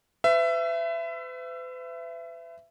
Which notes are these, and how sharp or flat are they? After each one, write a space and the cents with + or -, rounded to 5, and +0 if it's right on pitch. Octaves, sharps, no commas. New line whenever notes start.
B4 +45 E5 +25